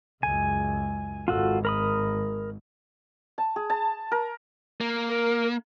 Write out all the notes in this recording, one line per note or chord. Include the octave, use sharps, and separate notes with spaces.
C#2 F#2 G#5
G#1 F4 F#4 A4
A#4 B5 D#6
A5
G#4
A5
A#4
A#3
A#4